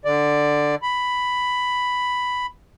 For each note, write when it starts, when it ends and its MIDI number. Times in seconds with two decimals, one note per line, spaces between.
0.05 0.75 50
0.05 0.75 74
0.82 2.46 83